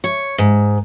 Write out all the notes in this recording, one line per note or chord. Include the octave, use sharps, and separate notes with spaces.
C#5
G#2